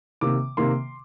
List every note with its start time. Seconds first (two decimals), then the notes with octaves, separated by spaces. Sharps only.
0.21 C3 D#3 A#3 D6
0.57 C3 D#3 A#3 C6